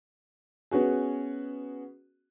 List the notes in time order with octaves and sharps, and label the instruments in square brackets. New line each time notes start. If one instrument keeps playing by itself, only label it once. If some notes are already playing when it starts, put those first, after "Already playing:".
[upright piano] B3 C#4 F#4 G#4